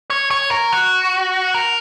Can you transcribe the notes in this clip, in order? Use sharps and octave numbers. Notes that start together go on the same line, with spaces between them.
C#5
C#5
A#4
F#4
A#4